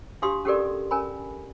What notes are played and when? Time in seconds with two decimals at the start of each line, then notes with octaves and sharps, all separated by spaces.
0.22 D4 F#4 G4 F5 C6 D#6
0.45 C#4 F#4 G4 A4 A#4 D5
0.91 C#4 A#4 G#5 B5